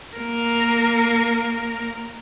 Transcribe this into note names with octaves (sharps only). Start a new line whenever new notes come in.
A#3 A#4